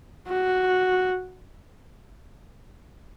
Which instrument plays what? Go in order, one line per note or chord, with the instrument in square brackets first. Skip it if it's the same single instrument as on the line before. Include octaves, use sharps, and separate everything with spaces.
[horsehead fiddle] F#4